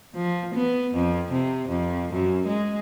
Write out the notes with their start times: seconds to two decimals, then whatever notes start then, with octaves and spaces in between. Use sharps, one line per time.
0.14 F3
0.55 B3
0.94 F2
1.32 C3
1.68 F2
2.13 F#2
2.47 G#3